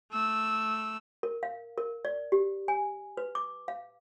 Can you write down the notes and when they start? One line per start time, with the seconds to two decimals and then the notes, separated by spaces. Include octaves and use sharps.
0.12 A3 E6
1.23 A#4
1.43 F5
1.78 A#4
2.05 D5
2.32 G4
2.68 G#5
3.17 B4
3.35 D6
3.68 F5